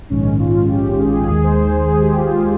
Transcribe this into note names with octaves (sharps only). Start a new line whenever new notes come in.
A#1 G#2 D#3 G#3 C#4
F4
G4
G#4
G4
G#4
D#2 D#3 G#3 G#4
C5
C5
G#4
G#4
G4
F4
G#4